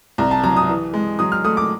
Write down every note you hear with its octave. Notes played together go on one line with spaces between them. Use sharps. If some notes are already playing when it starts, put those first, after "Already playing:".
C2 A#5
A5
F#3 A#5
D#6
E3
G#3
F#3 D#6
F6
A3 D#6
D6